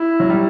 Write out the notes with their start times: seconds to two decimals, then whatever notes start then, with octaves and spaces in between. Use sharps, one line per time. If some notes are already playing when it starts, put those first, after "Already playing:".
Already playing: E4
0.20 F#3
0.30 G3